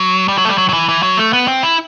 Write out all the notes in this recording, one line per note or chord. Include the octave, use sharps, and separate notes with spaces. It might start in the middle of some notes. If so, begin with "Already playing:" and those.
Already playing: F#3
G3
F#3
A3
G3
F#3
F#3
E3
E3
F#3
A3
B3
C4
E4